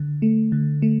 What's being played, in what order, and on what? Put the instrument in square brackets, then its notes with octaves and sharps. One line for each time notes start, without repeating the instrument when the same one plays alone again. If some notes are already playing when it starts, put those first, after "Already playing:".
Already playing: [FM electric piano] D3
A3
D3
A3